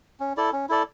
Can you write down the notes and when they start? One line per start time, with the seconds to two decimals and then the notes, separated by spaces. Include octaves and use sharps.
0.20 C#4
0.37 E4 A4 D5
0.53 C#4
0.69 E4 A4 D5